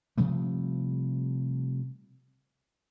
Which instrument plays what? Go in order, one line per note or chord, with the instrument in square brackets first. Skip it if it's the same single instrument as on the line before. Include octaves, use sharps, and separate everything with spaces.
[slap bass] C3 F3 G3 A3